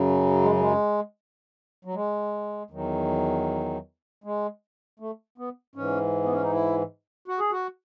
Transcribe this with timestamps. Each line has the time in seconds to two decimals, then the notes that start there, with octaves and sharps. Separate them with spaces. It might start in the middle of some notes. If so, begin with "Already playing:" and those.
Already playing: F#2 C#3 F#3
0.43 G#3
0.51 F#3
0.60 G#3
1.85 F#3
1.94 G#3
2.70 E2 D#3 F#3
4.24 G#3
5.00 A3
5.38 B3
5.76 G#2 E3 C#4
6.23 B3
6.32 C#4
6.42 D#4
6.53 E4
7.28 F#4
7.39 G#4
7.52 F#4